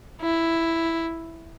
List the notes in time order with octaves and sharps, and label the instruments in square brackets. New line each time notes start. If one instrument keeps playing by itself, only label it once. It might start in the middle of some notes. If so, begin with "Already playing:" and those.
[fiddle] E4